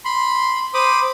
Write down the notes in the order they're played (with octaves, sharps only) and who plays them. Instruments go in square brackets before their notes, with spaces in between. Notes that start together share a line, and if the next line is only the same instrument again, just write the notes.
[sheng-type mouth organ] B5 C6
C5 B5 D6 D#6